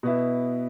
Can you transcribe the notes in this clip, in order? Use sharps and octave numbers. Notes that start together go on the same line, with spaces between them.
B2 B3 E4